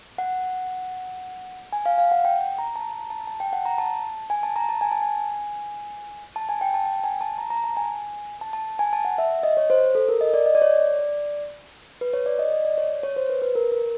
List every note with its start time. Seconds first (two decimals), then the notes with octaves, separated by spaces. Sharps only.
0.18 F#5
1.73 G#5
1.86 F5
1.98 F5
2.12 F#5
2.25 G5
2.58 A#5
2.76 A5
2.93 A#5
3.10 A5
3.27 A5
3.40 G5
3.53 F#5
3.66 A#5
3.78 A5
4.30 G#5
4.43 A5
4.56 A#5
4.69 A5
4.81 G#5
4.92 A5
5.02 G#5
6.36 A5
6.49 G#5
6.61 G5
6.74 A5
6.86 G5
7.04 G#5
7.21 A5
7.38 A#5
7.50 A#5
7.64 A5
7.77 G#5
8.41 A5
8.53 A5
8.79 G#5
8.93 A5
9.05 F#5
9.18 E5
9.43 D#5
9.57 C#5
9.70 C5
9.95 A4
10.09 A#4
10.21 D#5
10.34 D5
10.46 D#5
10.55 D5
10.62 C#5
10.70 D5
12.01 B4
12.13 C#5
12.26 D5
12.39 D#5
12.52 D#5
12.65 D5
12.78 C#5
13.03 C#5
13.16 C5
13.29 B4
13.42 B4
13.55 A#4
13.72 A#4